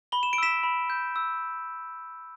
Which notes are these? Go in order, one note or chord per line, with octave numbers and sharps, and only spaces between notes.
B5 G7
E7
D7
E6 B6 E7
B5
G6
E6